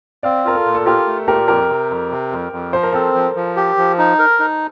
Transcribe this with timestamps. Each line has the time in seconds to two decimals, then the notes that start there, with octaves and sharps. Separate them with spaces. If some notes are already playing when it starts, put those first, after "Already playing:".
0.23 C4 D5 F5
0.45 F4 A#4
0.54 A4
0.66 A#2
0.75 A4
0.86 F4 G4 A#4
1.07 A3
1.28 A#2 G4 A#4
1.48 F2 G4 A#4
1.69 C3
1.90 F2
2.11 C3
2.32 F2
2.52 F2
2.73 F3 C5
2.83 A#4
2.92 C4 A4 C5
3.14 F3
3.35 F3
3.56 G4
3.77 F3
3.98 D#4
4.19 A#4
4.40 D#4